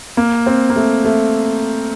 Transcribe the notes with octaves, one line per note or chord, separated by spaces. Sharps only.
A#3
C4
A#3
A3
A3